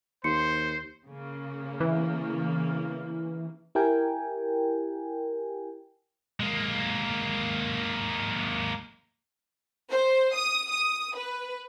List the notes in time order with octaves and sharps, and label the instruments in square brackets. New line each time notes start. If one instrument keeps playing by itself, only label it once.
[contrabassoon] D#2 [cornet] C5 [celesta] C6 C#7
[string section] C#3 A#3
[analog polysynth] E3
[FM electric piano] E4 G4 A#4 G5 G#5
[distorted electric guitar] G#3 A#3
[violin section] C5
D#6
D#6
B4